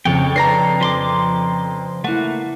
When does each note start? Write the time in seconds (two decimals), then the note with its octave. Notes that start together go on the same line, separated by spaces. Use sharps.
0.05 F2 C#3 C4 A4 C#5 G5
0.36 D4 B4 D5 A#5 A#6 C7
0.81 F3 C6 D6
2.04 A3 A#3 E4 F#5